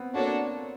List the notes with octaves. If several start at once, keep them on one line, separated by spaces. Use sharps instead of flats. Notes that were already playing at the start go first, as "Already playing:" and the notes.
Already playing: B3 C4
A#3 D4 F#4 A4 C#5